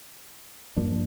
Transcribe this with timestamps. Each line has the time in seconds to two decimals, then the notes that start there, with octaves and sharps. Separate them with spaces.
0.76 G2 F3 A#3 D4